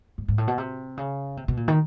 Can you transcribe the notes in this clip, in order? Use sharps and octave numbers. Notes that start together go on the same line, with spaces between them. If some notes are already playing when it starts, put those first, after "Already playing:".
G#2
G#2
A2
B2
C3
C#3
C3
B2
A#2
D#3